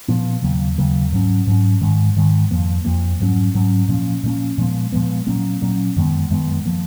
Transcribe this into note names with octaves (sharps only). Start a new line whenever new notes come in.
A#2 F3 B3
D#2 C#3 F#3 A#3
D#2 C#3 F#3 A#3
G#2 F#3 C#4
G#2 F#3 C#4
G#2 D#3 G#3
G#2 D#3 G#3
F2 F3 A#3
F2 F3 A#3
G#2 F#3 C#4
G#2 F#3 C#4
A#2 F3 A#3 C#4
A#2 F3 A#3 C#4
A#2 F3 G#3 B3
A#2 F3 G#3 B3
A#2 F#3 A#3 C#4
A#2 F#3 A#3 C#4
F#2 D#3 G#3 B3
F#2 D#3 G#3 B3
F3 A#3